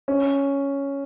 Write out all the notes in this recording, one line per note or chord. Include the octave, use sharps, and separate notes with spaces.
C#4